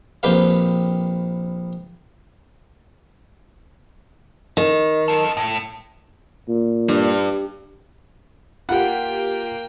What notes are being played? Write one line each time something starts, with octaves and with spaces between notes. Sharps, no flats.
A#1 C4 G4 B4 F5
D#3
F3 A4
A2
A#2
G2
A#3 F4 G4 F#5 G5 B5